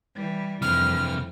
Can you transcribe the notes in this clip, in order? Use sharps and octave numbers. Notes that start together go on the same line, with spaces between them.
E3 G3
F2 C3 E3 F6